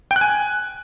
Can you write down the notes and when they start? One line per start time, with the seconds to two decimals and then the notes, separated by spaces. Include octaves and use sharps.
0.11 G5
0.16 F#6
0.21 G#5